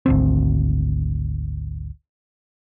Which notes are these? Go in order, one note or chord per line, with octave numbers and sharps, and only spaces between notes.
G#1 D2 C4